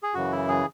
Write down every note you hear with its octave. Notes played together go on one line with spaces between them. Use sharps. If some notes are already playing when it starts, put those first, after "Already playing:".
G#4
F#2 C#3 E3 F#4
E4
G#4